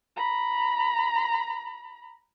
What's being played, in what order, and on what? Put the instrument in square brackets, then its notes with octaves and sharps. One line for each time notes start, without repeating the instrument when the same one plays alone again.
[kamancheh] A#5 B5